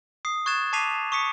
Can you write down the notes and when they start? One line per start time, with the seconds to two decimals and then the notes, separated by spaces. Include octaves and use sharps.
0.25 D#6 C7
0.46 C#6 F#6 G#6 A6 E7
0.73 A5 D6 B6 C7 D#7 F7
1.12 C#6 D#6 B6 C#7